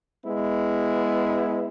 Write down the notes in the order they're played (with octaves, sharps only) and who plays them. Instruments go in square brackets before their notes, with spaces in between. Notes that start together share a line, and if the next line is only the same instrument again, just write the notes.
[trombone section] G#3 B3 E4